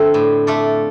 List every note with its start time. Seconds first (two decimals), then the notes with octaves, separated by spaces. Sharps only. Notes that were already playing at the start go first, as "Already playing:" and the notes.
Already playing: F2 D3 A3 C4 A4
0.14 A2
0.47 A3 F4 A4 D5